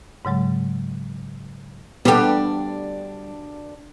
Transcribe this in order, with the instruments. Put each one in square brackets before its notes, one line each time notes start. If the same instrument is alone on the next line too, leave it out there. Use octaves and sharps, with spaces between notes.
[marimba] G#2 C#3 F#3 G#3
[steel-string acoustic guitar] D2 G2 D4 [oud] G3 G4 [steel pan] B3 A4